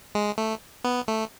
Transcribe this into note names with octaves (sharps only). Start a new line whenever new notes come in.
G#3
A3
B3
A3